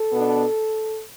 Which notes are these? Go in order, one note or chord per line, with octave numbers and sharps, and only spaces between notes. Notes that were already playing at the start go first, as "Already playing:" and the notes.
Already playing: A4
B2 B3 D4